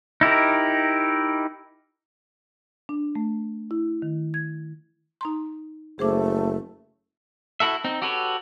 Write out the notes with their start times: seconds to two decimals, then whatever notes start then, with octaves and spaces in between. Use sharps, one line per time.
0.21 D#4 E4 G4 A#4
2.89 D4
3.15 A3
3.71 E4
4.02 D#3
4.34 G#6
5.21 D#4 A#5 C6
5.99 F#1 A3 G#4 C5 D6
7.60 E4 F#4 A4 E5
7.84 C4 D#4
8.02 F#4 G4 A4 B4 C#5